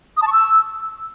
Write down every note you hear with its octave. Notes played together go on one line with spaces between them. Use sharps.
D#6
A5
C#6
E6